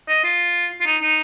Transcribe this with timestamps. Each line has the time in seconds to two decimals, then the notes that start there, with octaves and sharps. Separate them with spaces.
0.09 D#5
0.24 F4
0.81 F4
0.86 D#4
1.02 D#4